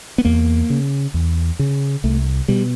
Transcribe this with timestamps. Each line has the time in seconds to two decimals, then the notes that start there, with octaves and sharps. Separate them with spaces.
0.18 B3
0.25 E2 A#3
0.70 C#3
1.14 E2
1.59 C#3
2.04 C2 A3
2.48 B2 G3